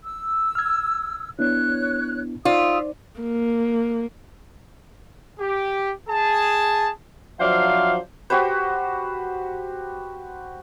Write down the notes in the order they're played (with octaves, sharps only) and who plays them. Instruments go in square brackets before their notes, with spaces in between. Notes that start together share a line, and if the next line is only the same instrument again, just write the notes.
[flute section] E6
[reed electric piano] F6 G#6
[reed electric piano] B3 D4 E4 [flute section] C#5 F#6
[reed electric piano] D#4 C5 D5 [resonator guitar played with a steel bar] F4 [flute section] E5 D#6
[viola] A#3
[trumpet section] G4
G#4 A5
[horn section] F3 F#3 D4 C5 E5 F5
[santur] F#4 G4 B4 C5